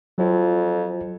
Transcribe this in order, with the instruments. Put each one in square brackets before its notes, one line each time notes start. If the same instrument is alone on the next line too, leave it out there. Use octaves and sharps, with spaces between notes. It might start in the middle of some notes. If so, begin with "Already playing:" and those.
[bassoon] F2 [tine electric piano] F#3 F4